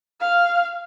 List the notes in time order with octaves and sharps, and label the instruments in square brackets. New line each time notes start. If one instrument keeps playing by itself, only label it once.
[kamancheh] F5